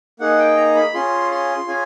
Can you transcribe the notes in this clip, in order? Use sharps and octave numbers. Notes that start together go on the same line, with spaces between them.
A#3 D#4 G#4 F#5
G5
A#5
B5
C#4 F4 G#4 C6
C6
C#4 F4 G#4 G#5